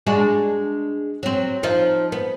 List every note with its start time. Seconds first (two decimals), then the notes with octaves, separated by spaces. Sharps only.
0.07 G#3 D4 F#4
1.23 F#3 C4
1.63 F3 D#4 F4
2.12 B3